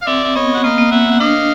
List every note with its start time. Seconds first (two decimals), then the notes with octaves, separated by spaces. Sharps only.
0.02 F5
0.07 C4 D5 E5
0.24 E5
0.35 B3 C#5 D#5
0.55 F#5
0.64 A#3 D#5 F5
0.78 A#3
0.92 E5 F#5
1.12 F#5
1.20 D4 D#5 F5